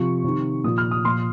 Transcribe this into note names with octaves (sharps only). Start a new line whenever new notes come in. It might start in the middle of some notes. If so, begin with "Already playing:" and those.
Already playing: C3 F3 C#6
C3 D#3
A#2 F3 D#6
F6
D#6
A#2 F3 C6